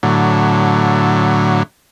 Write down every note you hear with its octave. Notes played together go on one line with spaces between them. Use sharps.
A2 D3 F#3